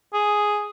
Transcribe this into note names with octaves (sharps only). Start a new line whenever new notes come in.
G#4